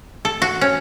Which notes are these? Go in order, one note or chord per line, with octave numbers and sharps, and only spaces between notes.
A4
F#4
C#4